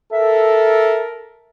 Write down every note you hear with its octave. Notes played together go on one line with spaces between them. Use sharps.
A4 A#4 E5